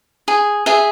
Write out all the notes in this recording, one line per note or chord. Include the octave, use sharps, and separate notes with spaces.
G#4
G#4 E5